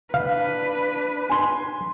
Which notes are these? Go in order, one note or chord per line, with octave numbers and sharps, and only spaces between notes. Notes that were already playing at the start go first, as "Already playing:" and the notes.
D4 B4 F5
G#5 C6